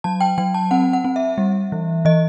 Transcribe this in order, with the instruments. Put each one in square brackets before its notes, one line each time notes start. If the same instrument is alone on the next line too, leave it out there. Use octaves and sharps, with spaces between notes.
[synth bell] F#3 A5
G5
F#3 G5
A5
C4 F#5
F#5
C4
E5
G3
E3
E3 D#5